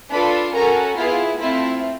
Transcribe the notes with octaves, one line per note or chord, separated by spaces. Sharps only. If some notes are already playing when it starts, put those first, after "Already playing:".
D4 F4 A4 B4 B5
C#4 F#4 A4 A#4 A#5
B3 E4 F4 G#4 F5
A3 C4 E4 F4 E5